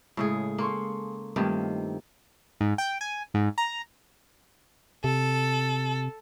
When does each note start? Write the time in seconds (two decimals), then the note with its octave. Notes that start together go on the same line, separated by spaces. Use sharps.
0.17 A2 C#3 G#3 G#4
0.58 A#3 A4 C6 C#6
1.36 G2 D#3 A3 A#3 C4 F4
2.61 G#2
2.78 G5
3.01 G#5
3.34 G#2
3.58 A#5
5.04 C3 A4